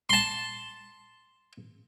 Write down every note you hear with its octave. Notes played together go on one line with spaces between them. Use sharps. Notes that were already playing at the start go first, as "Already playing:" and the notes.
A5 C6